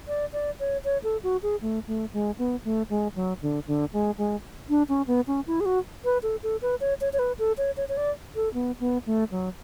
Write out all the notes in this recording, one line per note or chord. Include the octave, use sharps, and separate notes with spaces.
D5
D5
C#5
C#5
A4
F#4
G#4
A3
A3
G#3
B3
A3
G#3
F#3
D3
D3
G#3
G#3
D4
C#4
B3
C#4
E4
G#4
F#4
B4
A4
A4
B4
C#5
C#5
C#5
B4
A4
C#5
C#5
C#5
D5
A4
B3
B3
A3
F#3